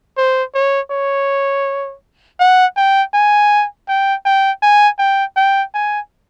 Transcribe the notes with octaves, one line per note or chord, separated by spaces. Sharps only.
C5
C#5
C#5
F#5
G5
G#5
G5
G5
G#5
G5
G5
G#5